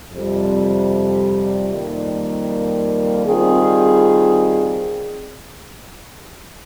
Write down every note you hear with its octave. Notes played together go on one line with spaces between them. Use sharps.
F2 C3 G3
F2 D#3 G3 A#3
D#3 G3 C4 F4 G#4